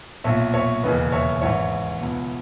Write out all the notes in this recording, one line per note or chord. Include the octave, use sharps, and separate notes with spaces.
B1 A#2 C#5 E5
C#5 E5
E1 D#2 C#3 E3 B4 D#5
C#5 E5
G#1 G#2 E3 C#5 E5
C#2 B2